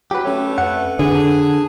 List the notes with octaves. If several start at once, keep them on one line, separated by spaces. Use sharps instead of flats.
F#3 G4 B4
A3 C#4 C#5
F2 B4 F#5
D3 G#4
D4 A5